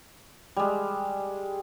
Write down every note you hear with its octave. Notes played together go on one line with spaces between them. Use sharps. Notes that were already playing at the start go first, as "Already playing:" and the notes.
G3 G#3